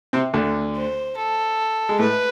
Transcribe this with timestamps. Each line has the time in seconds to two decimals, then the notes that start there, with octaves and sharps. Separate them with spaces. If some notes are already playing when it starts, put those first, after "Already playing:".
0.13 C3 C4
0.34 D2 D3
0.76 C5
1.17 A4
1.89 G#3
1.99 A2 A3 B4